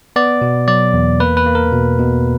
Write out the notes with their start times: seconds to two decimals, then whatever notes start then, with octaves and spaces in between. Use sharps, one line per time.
0.16 B3 D5
0.42 B2
0.68 F#3 D5
0.94 E2
1.20 A#3 B4
1.37 B4
1.46 A#3
1.55 A#4
1.72 B2
1.99 B2